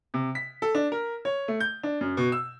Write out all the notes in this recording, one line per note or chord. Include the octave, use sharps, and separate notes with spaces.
C3
B6
A4
D4
A#4
C#5
A3
G6
D4
F#2
B2
E6